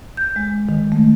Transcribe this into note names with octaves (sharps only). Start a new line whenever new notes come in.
G6
G#3
D#3
A3